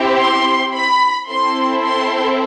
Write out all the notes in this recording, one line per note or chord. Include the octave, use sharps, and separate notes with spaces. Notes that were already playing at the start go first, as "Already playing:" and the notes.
Already playing: C4 E4 G4
C6
B5
C4 E4 A4 C6
C6